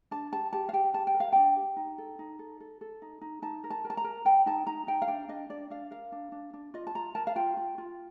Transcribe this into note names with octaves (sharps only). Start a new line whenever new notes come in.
D4 A5
G4 A5
G4 A5
F5
G4 G5
G4 A5
G5
A#4
F5
D4 G5
G4
D#4
A4
D#4
A4
A4
A4
D#4
D#4
D#4 A5
A#4
A5
A#4
A5
A#5
A#4
A#4 G5
D#4 A5
D#4 A#5
D#4 G5
F5
D4 G5
D4 D#5
D4 D5
D4 F5
A#4 F5
D4
D4
D4
F4 D#5
A5
F4 A#5
A#4 A5
F5
F4 G5
F4
F4